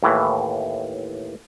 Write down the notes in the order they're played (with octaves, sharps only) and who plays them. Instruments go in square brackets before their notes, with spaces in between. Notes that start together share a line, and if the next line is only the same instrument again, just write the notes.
[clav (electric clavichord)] D#2 A2 E3